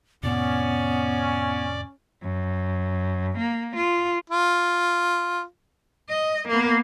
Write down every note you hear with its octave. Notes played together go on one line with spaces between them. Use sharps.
F2 A2 C3 B3 C#4 D5 D6
F#2
A#3
F4
F4
D#5
A#3 B3